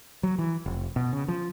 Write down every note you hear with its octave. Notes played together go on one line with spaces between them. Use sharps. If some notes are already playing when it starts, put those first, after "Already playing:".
F#3
E3
F1
B2
C#3
F3